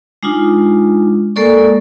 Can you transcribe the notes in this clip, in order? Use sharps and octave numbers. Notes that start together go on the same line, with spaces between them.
G#3 D4 D#4 F4
G#3 A#3 A4 A#4 D5 C#6